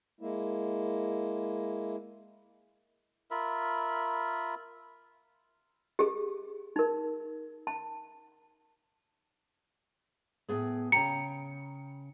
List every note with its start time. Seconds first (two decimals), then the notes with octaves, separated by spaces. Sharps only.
0.21 G#3 A#3 E4
3.31 F4 A#4 E5 B5
5.99 G4 G#4
6.76 D#4 A#4
7.67 A5
10.48 A2 B3 G#4
10.92 C#3 G5 A#5 C#7